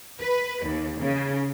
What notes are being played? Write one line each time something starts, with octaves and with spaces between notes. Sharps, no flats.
B4
D#2
C#3